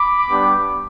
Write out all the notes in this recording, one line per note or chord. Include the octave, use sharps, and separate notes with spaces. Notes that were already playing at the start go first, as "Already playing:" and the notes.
Already playing: B5 D6
G3 B3 D4 G4